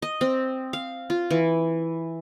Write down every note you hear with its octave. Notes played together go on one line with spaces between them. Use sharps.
D#5
C4
F5
F4
E3